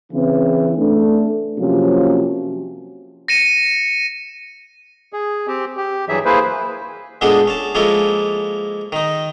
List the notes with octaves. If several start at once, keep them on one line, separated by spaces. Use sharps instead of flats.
C#3 E3 C4
A3 D4
C3 F3 F#3 A#3 C4 C#4
A#6 C#7 D#7 E7
G#4
C4 G4
G4
G2 E3 F#3 G#4 E5
A#3 E4 G#4 B4 C5
A#2 G#3 B3 D4 G#4 A4
C#4 A5
F3 G#3 A#3 C#4 E4 A4
D#3 D#4